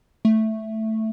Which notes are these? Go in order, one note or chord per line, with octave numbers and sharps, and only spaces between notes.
A3